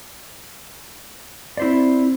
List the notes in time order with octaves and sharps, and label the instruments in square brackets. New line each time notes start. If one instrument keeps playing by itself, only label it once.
[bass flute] C4 [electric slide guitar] E4 C5 D5